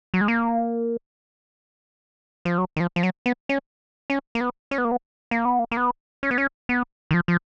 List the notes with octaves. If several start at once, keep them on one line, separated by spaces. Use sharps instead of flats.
F#3
G#3
A#3
F3
F#3
D#3
F3
F3
F#3
B3
C#4
C#4
A#3
B3
C#4
B3
A#3
B3
A#3
B3
A#3
A#3
B3
C#4
B3
C#4
B3
D#3
F3
F3